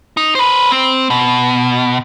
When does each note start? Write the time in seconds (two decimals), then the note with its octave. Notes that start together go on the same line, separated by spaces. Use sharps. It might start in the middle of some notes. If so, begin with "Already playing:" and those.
0.17 D#4
0.35 B4 C5
0.71 C4
1.10 B2